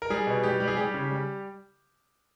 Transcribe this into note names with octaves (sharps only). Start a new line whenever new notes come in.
A#4
G3 G#4
B2
G3 G4
G3
G#4
G3 G4
C#3
G3